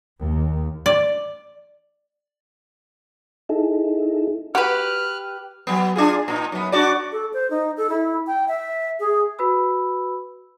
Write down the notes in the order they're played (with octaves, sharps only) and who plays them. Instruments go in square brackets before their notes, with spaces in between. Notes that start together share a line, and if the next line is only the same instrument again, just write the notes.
[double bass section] D#2
[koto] D5
[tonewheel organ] D#4 E4 G#4 A4
[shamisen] F#4 [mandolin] G4 B4 [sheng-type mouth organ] F6 F#6
[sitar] F#3 B3
D4 F4 G#4
A#2 D#4
F#2 B3
D4 F#4 D5
[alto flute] A4
C5
D#4
A4
E4
G5
E5
G#4
[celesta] F#4 B4 B5 E6